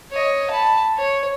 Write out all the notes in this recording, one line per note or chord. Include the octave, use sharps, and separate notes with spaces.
C#5 D#5
A5 B5
C#5